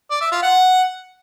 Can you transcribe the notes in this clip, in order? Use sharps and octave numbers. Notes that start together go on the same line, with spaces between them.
D5
E5
F4
F#5